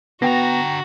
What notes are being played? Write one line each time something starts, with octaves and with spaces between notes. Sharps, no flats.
D3 B3 F#4 G5 A#5 A#6